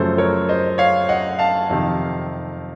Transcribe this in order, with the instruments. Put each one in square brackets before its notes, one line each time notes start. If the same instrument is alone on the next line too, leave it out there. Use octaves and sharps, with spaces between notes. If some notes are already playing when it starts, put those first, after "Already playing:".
Already playing: [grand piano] F#2 C#3 F3 A3 A4 C5
A#4 C#5
C5 D#5
C#5 F5
D#5 F#5
F5 A5
F2 C3 D#3